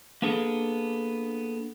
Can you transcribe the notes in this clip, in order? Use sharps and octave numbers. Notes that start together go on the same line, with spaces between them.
A#3 B3 D4 G#4 A4